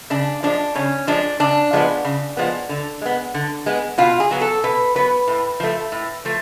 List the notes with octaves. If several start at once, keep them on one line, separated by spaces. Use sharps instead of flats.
C#3 D4
F3 G#3 D4
C#3 C#4
F3 G#3 D4
C#3 D4
F3 G#3 B3
C#3
F3 G#3 B3
D3
G#3 B3
D3
G#3 B3
B2 F4
G#4
F#3 B3
A4
B2 B4
F#3 B3 B4
A2
F3 A3
A2
F3 A3